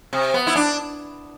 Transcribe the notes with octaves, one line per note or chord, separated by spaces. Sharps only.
C3
B3
E4
D4